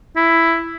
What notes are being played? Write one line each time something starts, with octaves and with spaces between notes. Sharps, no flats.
E4